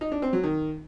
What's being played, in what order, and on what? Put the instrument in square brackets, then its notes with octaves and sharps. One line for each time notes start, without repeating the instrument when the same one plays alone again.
[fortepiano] D#4
D4
C4
F#3
D#3